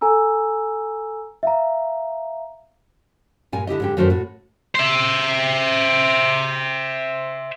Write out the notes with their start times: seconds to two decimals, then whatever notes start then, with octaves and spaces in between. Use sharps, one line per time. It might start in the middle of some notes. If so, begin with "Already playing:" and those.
0.01 A4 G#5 A#5 E6
1.43 E5 F5 A#5
3.52 G2 A#2 G#5
3.67 D3 E4 G4 D#5
3.80 G#2 D3 G4
3.97 F#2 D#3 A3 F#4 A#4 C5
4.10 A2 F#4
4.75 C5 E5